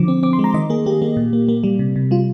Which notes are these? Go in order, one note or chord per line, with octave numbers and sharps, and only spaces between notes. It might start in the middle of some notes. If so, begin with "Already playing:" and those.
Already playing: D3 F3 D6
C4
C4 D6
C6
G#3
A#5
D#3 D#5
A#3 G#4
A#3 G4
A#3
A#2
A#3
A#3
G3
C3
C3
G3 F4